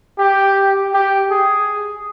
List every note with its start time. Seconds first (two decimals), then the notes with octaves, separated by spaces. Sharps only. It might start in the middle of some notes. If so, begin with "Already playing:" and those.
0.18 G4
0.93 G4
1.31 G#4